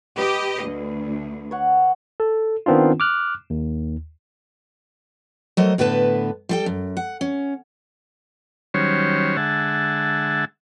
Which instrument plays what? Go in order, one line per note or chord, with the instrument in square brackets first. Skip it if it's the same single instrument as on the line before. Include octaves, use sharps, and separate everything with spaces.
[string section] G4 D#5 [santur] B4
[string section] D2
[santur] C#5 F#5
[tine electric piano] A4
D#3 B3 C4 D4 F4
D6 F6 F#6
D#2
[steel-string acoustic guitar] F#3 A3 A#4 C5 D#5
A2 D3 B3 B4 A5
G3 A4 G5
F#2
F#5
C#4
[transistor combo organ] D#3 F#3 G3 C#4 C5 C#5
D3 G#3 E5 F#5 A5